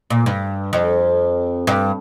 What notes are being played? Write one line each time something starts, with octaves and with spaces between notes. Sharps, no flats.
A#2
G2
F2
G2